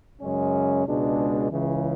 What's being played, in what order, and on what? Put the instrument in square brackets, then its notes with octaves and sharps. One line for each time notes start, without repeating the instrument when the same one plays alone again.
[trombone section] F#2 C#3 G#3 C#4
C#2 B2 G#3 D4
C#2 C#3 E3